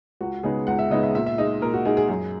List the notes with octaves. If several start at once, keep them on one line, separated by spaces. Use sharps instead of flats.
C#2 F#4
C#3 G#3 B3 D#4 G#4
C#2 F#5
E5
C#3 G#3 B3 D#4 D#5
E5
A#2 E5
E5
G#3 D#4 D#5
A#2 A#4
F#4
G#3 D#4 G#4
G#4
F#2 G#4